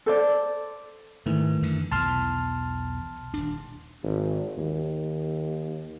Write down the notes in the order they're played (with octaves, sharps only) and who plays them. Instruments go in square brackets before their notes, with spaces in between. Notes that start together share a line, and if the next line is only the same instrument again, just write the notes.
[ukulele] A4 C5 D5
[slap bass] G#2 [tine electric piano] D#3 E3 A3
[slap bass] F#2 D3
[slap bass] B1 E2 E3 [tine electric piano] A5 C6 F6
[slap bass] D#1 D4
[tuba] G#1
D#2